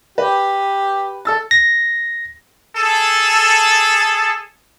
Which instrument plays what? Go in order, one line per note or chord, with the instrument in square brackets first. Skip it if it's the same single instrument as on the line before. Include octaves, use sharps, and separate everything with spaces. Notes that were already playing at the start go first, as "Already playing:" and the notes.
[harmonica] G4 [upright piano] B4
[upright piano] A4 E6 A6
[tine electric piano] A#6
[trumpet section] G#4 A4